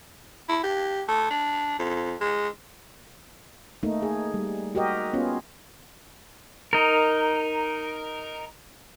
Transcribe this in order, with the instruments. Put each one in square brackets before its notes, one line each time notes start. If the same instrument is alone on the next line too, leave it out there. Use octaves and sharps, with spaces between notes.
[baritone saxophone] E4
G4
A3
D4
F2
G#3
[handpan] A3 A#3 D#4
G#4
G3
F#4 G4 A#4 D#5
B3 C#4 F4
[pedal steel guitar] D#4 A#4